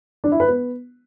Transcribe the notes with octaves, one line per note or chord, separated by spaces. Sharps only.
D4
E4
B4
B3